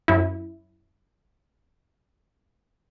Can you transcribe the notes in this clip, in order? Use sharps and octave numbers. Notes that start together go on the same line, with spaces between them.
F#2 E4